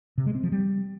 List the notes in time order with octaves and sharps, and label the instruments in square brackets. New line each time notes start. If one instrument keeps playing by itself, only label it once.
[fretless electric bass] C3
G#3
C4
F3
G3